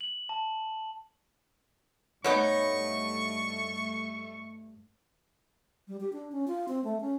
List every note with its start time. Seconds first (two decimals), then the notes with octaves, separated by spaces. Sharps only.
0.01 F#7
0.29 A5
2.24 G2 B2 A3 B3 D#4 C#5 C#6
5.88 G3
6.00 G4
6.13 D4
6.32 C#4
6.48 F4
6.68 C4
6.84 A3
7.01 C#4